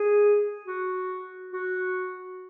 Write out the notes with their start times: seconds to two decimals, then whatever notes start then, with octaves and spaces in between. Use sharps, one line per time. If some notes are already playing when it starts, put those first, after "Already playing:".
Already playing: G#4
0.66 F#4
1.53 F#4